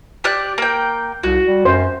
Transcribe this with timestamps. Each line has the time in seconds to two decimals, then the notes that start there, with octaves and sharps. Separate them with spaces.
0.24 G4 D5 F#6
0.58 A#3 G5
1.23 C2 F#4
1.46 G3
1.65 F#2 C5